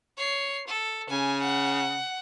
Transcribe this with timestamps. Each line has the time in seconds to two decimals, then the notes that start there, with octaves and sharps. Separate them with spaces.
0.18 C#5 C7
0.68 A4
1.10 C#3 G#5
1.42 F#5